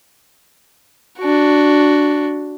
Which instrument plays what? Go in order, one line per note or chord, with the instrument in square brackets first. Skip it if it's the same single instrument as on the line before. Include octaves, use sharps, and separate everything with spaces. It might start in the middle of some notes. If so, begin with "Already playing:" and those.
[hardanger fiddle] D4 F#4